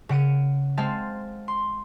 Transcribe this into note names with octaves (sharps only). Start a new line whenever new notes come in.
C#3 F#5 D7 D#7
G#3 C4 F5 A5 A6
C6